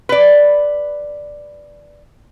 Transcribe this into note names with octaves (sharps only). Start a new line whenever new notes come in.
B4 D5